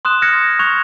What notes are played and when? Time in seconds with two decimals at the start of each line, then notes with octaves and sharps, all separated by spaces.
0.05 C6 D#6 F#6 E7
0.22 F6 F#6 G#6 A#6 C#7
0.59 C#6 F#6 G#6 F7